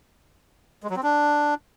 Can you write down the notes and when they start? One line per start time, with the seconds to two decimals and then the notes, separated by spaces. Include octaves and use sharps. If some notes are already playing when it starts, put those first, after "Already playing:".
0.83 G#3
0.90 F#3
0.96 C4
1.03 D4